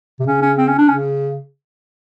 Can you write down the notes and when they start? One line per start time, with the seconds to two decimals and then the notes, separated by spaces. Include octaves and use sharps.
0.19 C3
0.26 C#3 C#4
0.42 C#4
0.58 C4
0.68 C#4
0.78 D4
0.88 C#3 C#4